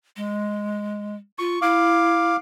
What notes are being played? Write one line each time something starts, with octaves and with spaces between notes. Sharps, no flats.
G#3
F4 C#6
E4 F5 D6